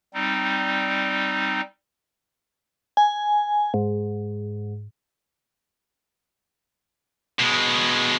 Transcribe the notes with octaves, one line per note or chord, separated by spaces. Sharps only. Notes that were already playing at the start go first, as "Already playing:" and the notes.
G3 C4 D#4
G#5
G#2
B2 G#3